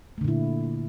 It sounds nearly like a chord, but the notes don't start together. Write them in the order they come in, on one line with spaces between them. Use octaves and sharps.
A3 D3 A#2 E4